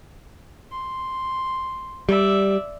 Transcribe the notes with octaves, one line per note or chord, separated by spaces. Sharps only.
C6
G3 D5 E5